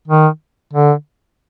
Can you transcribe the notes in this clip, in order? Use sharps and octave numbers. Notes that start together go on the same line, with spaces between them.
D#3
D3